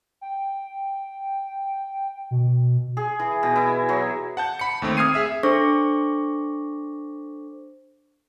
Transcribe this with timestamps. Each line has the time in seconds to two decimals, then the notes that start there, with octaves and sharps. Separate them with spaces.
0.21 G5
2.31 B2
2.97 G#4
3.19 E3
3.43 B2
3.56 E4
3.89 F#3
4.37 F#5 A5 G6
4.59 B5 C#7
4.82 D#2 A3 C4
4.97 D#6 F6 G#6 C7 D#7
5.14 G#4 E5 E6
5.43 D4 A4 C5 C#6 D6 A#6